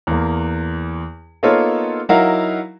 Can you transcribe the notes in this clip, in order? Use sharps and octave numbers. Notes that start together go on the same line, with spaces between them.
E2 A#3
A#3 B3 D#4 F4 A4 C#5
F#3 D#4 E4 F#4 A#4 F5